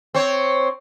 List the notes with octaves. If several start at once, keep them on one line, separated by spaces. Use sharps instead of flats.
C4 C#5